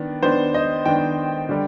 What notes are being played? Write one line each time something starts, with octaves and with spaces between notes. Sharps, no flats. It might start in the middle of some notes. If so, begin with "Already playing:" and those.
Already playing: D#3 B3 D4
D#3 B3 D4 C5
D#5
D#3 B3 D4 G5
D3 G3